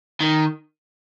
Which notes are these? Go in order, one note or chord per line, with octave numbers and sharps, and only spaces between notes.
D#3